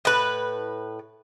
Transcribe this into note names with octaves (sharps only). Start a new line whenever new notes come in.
A2 B4